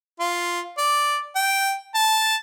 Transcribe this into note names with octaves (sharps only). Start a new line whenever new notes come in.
F4
D5
G5
A5